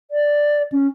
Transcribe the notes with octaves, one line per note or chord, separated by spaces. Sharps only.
D5
C#4